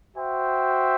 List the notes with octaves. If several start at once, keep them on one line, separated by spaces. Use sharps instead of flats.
F#4 C5 E5 G5